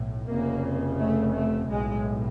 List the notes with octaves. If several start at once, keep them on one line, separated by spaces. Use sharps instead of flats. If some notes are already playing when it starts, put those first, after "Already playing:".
Already playing: B1 A2
F1 F2 C#3 A#3
A3
A3
B1 A2 G#3